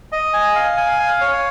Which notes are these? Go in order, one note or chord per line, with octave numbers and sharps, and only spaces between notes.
D#5
G#5
F5
G#5
F5
C#5